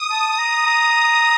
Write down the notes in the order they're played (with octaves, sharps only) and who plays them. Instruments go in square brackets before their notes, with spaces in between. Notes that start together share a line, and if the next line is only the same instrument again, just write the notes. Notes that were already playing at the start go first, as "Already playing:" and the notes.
Already playing: [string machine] D#6
[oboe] A5
A#5
A#5